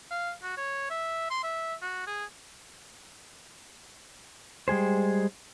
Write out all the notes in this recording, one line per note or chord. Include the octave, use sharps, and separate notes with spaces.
F5
F#4
C#5
E5
C6
E5
F#4
G#4
G3 G#3 G#4 C5